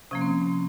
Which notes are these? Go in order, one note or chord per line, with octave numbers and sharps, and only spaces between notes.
C3 F3 A#3 C#4
C4
C4